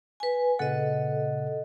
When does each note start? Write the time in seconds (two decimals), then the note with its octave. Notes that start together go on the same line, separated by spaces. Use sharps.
0.20 B4 G#5
0.59 A#2 C#3 A4 D#5 F#5